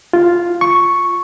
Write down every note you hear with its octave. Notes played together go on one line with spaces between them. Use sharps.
F4
C#6